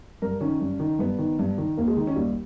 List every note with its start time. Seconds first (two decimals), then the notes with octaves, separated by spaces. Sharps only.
0.22 G2 A#4
0.41 D#3 C#4
0.61 G2
0.80 D#3
0.99 G2 B3
1.18 D#3
1.39 G2
1.58 D#3
1.77 D#2 A#3
1.88 G#3
1.96 D#3 D#4
2.07 C#4
2.16 D#2 G3